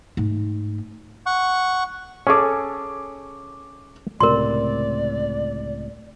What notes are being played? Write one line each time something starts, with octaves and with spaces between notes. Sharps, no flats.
G#2 A3
F#5 C#6
C#4 G#4 A4 C#6 D6
C#2 A2 C3 A#4 D5 C6